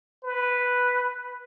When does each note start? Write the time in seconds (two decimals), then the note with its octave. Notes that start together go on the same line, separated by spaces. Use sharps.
0.24 B4